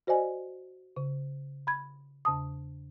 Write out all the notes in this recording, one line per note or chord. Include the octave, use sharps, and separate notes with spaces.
F#4 C5 D5 D#5 G#5
C#3
B5 G#6
E2 C#3 A5 D#6